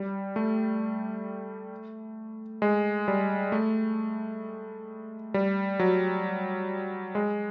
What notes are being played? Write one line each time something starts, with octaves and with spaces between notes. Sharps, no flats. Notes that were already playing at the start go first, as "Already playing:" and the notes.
Already playing: G3
A3
G#3
G3
A3
G3
F#3
G#3